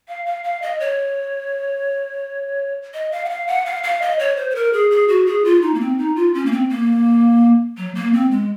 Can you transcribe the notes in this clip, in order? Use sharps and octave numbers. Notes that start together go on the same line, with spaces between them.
F5
F5
F5
D#5
C#5
D#5
F5
F#5
F5
F#5
F5
F5
D#5
C#5
C5
C5
A#4
G#4
G#4
F#4
G#4
F4
D#4
A#3
C4
D#4
F4
C#4
A#3
C4
A#3
F#3
A#3
C4
G#3